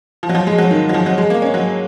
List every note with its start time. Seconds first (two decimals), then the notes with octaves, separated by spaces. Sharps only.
0.23 F3
0.29 F#3
0.35 F3
0.47 G#3
0.58 F#3
0.71 D#3
0.89 F#3
0.94 F3
1.06 F#3
1.18 G#3
1.30 A#3
1.42 C#4
1.54 F#3